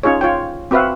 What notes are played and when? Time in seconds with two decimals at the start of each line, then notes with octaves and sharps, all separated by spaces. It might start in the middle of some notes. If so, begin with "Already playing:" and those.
0.03 C#4 D#4 F4 G#4 C#5
0.21 F4 C#5 G5
0.71 C4 F#4 B4 E5 F5